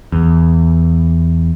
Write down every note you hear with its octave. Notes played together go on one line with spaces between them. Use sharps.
E2